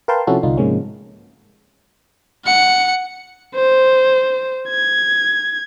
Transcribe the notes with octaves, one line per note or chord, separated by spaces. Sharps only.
A#4 B4 F5 G5 A5 C6
C3 F3 C#4 E4 F#4 A4
C2 D3 D4 D#4 F4
G#2 C3 F3 G#3 A#3 C#4
F#5 C#7
C5
G#6